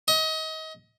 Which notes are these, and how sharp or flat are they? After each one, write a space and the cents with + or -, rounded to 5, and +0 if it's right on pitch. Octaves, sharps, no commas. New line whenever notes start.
D#5 +30